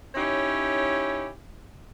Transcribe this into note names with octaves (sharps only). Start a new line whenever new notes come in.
C#4 D#4 E4 G4 C#5